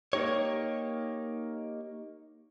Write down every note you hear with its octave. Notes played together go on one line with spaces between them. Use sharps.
A#3 D#4 G4 C#5